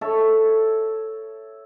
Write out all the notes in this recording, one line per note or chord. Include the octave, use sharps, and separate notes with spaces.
A4 C#5 E5